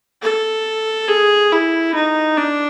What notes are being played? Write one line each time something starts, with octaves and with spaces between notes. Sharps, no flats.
A4
G#4
E4
D#4
D4